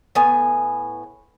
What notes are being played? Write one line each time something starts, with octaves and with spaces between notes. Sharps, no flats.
A2 B3 G#5